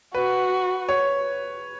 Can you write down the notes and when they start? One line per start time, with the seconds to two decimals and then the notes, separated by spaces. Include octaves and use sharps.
0.15 F#4 B4
0.89 C#5